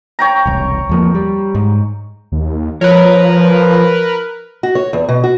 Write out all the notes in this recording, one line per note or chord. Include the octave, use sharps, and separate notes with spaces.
C#5 G5 A#5
E1 C2
E2 F3 A#3
G3
G#2
D#2
F3 A#4 B4 C#5
F#4
C#5
E2
B2
F#4